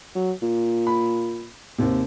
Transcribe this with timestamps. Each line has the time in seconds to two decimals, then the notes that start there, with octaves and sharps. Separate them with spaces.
0.15 F#3
0.42 A#2
0.87 B5
1.78 D#2 C3